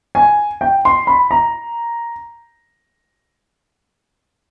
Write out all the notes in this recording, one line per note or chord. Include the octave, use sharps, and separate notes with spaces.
G#5
G5
C6
B5
A#5